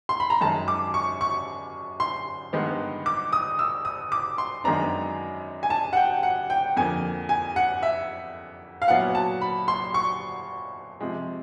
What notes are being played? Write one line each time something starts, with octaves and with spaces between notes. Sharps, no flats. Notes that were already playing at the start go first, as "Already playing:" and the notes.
C6
B5
A#5
F#2 D#3 G#3 A5
D6
C#6
C#6
C6
G2 D#3 G#3 B3
D6
D#6
E6
D#6
D6
C6
F#2 D#3 G#3 B3 D4 A#5
G#5
A5
F#5
G5
F#5
G5
F2 D3 F3 A#3 G#5
G#5
F#5
E5
F5
A#2 F#3 B3 E4 F#5
A5
B5
C6
C#6
C3 F3 G#3